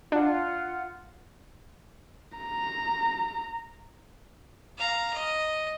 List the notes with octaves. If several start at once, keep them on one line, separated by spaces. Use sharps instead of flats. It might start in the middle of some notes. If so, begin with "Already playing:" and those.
D4 F4 F#5
A#5
F5 A#5
D#5